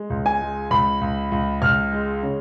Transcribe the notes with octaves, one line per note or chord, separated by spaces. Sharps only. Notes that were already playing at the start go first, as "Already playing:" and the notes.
Already playing: G#3
C#2
G#5
G#3
C#2 B5
C#2
C#2
C#2 F6
G#3
C#3